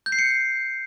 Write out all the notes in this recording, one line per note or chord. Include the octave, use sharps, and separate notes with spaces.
G6
C7
C#7